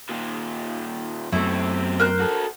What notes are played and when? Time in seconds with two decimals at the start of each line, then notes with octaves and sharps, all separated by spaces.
0.09 A#2 D#3
1.32 F#2 B2 A3 C4 E4
1.99 A#4 C5 F#6
2.20 F#4 A4